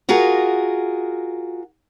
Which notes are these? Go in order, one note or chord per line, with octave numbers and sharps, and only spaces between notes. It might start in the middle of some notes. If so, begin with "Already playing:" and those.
F4 F#4 G#4 A#4